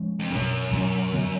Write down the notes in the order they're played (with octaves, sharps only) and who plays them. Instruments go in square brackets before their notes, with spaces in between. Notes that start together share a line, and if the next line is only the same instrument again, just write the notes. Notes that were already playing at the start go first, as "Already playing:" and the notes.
Already playing: [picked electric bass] F3 G#3 C#4
[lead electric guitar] F2
[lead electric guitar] F#2 [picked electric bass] B2 F#3 C#4
[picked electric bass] B2 F#3 C#4
D3 F#3 B3